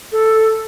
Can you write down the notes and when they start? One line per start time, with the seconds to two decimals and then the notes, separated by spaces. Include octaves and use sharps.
0.12 A4